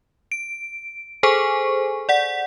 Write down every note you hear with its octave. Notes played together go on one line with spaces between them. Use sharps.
D7
G#4 A4 C5 G#5 C#6
D5 F#5 B6